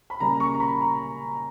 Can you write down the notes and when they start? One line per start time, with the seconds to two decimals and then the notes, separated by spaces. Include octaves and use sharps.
0.10 B5
0.20 C#3 G3 A#3 C#4 A#5
0.40 C#6
0.54 A#5
0.60 B5
0.81 A#5